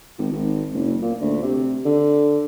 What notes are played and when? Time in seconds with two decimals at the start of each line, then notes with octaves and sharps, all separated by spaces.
0.18 G#1
0.31 G#1
0.73 F#1
1.01 A#2
1.21 D2
1.42 C3
1.85 D3